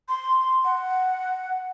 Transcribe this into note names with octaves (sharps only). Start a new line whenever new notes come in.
C6
F#5